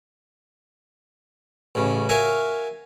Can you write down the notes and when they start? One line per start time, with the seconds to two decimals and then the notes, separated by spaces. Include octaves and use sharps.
1.75 A1 A2 C#3
2.09 F#4 A#4 C#5 E5 F5 G#5